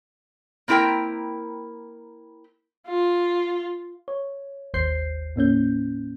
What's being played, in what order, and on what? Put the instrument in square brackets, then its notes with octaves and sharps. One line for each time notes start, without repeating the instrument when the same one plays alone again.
[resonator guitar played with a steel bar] A#3 C4 E4 A#4 G5
[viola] F4
[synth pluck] C#5
G#1 D#2 C5 G6 C7
A2 A#3 C#4 G6